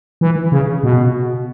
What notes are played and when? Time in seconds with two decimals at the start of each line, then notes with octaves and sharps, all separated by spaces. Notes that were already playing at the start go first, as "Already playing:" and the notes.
0.21 E3
0.52 C#3
0.84 B2